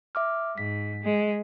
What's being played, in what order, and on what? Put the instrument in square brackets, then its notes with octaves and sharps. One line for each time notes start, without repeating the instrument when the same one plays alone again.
[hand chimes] E5 D6 F6
[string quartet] G#2 [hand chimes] B6
[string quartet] G#3